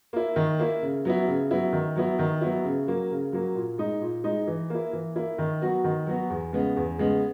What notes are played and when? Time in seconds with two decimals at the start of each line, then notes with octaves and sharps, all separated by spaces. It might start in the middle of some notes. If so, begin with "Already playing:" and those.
0.13 A#3 E4
0.36 D#3
0.59 A#3 E4
0.82 C#3
1.05 F#3 B3 E4
1.27 C#3
1.51 F#3 B3 E4
1.73 D#3
1.96 F#3 B3 E4
2.19 D#3
2.41 F#3 B3 E4
2.65 C#3
2.87 F#3 A#3
3.11 C#3
3.32 F#3 A#3
3.55 A#2
3.78 G#3 D#4
4.01 A#2
4.24 G#3 D#4
4.47 E3
4.70 A#3 E4
4.93 E3
5.16 A#3 E4
5.38 D#3
5.61 F#3 B3 F#4
5.84 D#3
6.07 F#3 B3 F#4
6.30 E2
6.53 C#3 G#3 B3
6.76 E2
6.98 C#3 G#3 B3